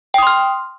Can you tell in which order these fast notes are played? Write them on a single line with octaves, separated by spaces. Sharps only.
G5 D#6 C6 F6